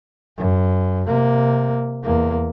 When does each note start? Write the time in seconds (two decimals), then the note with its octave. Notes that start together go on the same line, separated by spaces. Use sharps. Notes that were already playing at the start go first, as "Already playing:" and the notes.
0.38 F#2
1.07 C3 A#3
2.03 E2 A#3